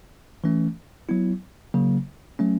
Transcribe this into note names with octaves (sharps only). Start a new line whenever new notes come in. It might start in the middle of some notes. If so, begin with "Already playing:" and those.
E3 A3 C#4
F#3 B3 E4
C#3 F#3 A#3
F#3 A3 C#4